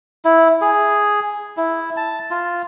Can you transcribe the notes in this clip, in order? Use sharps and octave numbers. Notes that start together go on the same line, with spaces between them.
E4
G#4
E4
A5
F4